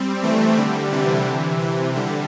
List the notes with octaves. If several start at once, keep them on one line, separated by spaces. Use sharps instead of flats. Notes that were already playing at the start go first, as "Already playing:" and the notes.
Already playing: G3 C4
E3 A3
D3 G3
C3 E3
C3 E3
D3 G3